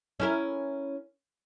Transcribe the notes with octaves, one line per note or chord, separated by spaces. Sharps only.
C#4 E4 A#4